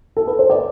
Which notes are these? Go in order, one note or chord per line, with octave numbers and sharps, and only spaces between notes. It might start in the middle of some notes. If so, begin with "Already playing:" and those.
A4
B4
C5
D5